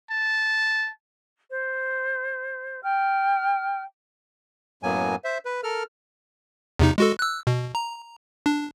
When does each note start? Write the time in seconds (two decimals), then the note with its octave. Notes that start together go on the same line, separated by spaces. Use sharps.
0.10 A5
1.49 C5
2.83 G5 F6
4.83 F#2 A2 F#3 A#3 B3 G#5
5.24 C5 E5
5.45 B4
5.63 A4 A#4 F6
6.79 E2 C3 D#4
6.98 G#3 F#4 A4
7.19 E6 F#6
7.47 B2
7.75 A#5
8.46 D4